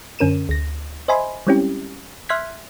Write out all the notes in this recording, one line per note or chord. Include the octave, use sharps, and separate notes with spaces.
F#2 D3 C#4 A#4 D#7 E7
D2 A#6
C5 D#5 E5 G#5 B5 C6
G3 G#3 C4 C#4 E4 G4
E5 C6 F6 F#6 G#6 B6